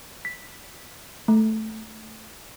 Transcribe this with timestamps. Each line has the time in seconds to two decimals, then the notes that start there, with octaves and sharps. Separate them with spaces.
0.25 B6
1.28 A3